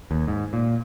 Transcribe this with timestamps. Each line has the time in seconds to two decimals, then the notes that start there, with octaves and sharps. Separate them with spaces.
0.11 D#2
0.27 G#2
0.53 A#2